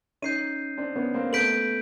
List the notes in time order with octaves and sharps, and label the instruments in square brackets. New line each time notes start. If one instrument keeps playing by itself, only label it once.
[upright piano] C#4 D#4 [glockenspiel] G6 C7 D#7
[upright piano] C4 D4
B3 C#4
A#3 C4
[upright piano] A3 B3 [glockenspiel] G6 B6 D7 F#7